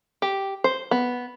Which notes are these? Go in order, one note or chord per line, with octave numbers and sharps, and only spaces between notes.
G4
C5
B3